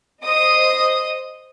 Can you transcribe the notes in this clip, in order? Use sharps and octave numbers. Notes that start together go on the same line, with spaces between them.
C5 D#5 D#6